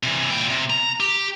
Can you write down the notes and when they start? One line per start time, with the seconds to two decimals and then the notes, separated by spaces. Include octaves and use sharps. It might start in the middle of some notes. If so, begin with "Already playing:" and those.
0.03 C3 E3
0.31 A#2 G5
0.50 C3
0.70 A#5
1.00 G4